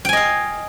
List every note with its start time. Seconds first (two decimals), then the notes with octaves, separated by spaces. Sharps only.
0.05 G5
0.09 G#5
0.13 D#5
0.17 F5